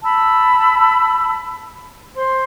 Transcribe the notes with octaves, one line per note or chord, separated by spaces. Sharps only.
A5 B5 E6
C5 C6